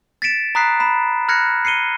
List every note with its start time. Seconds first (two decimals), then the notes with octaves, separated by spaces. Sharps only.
0.22 A6 B6 C#7 D7 E7
0.55 A#5 B5 D#6 F#6 B6 C7
0.80 B5 E7
1.28 B5 F6 F#6 G#6 A#6 C#7
1.65 C7 C#7 D#7 G7